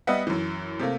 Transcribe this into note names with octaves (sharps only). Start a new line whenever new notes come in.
G3 B3 D#5 E5 F#5
F#2 E3
C3 A3 A#3